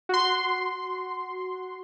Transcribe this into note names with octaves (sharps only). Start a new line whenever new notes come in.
F#4 C6